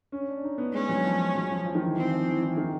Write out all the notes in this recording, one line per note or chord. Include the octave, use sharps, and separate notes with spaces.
C#4
D4
D#4
B3
G#3 C#4
F#3
F3
F#3
F3
F3
D#3
E3
E3 C4
F3
E3
E3
D#3